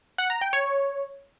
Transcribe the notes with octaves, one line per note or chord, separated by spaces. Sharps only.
F#5
A#5
G5
C#5